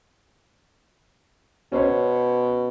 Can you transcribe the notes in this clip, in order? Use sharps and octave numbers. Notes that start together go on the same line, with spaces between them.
B2 C#4 C5 C#5